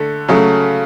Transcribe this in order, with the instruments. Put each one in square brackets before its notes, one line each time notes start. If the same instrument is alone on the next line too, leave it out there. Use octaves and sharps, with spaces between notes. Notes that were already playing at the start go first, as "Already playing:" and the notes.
Already playing: [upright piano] D3 A3
C#3 F#3 A3